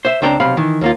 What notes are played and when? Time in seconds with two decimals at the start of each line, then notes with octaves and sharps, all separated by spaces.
0.05 C5 E5
0.22 C#2 C4 D4 G5 A#5
0.40 B1 C3 F5 B5
0.57 D#3 E3
0.81 D#2 A#3 F4